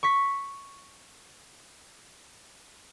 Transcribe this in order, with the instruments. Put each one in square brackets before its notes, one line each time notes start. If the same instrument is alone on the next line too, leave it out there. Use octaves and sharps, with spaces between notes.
[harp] C#6 B6